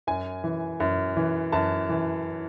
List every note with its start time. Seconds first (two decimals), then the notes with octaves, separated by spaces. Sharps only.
0.07 F#2 G#5
0.44 E3
0.80 F#2
1.17 E3
1.52 F#2 A5
1.89 E3